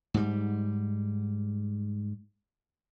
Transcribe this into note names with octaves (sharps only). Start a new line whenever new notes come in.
G#2 G3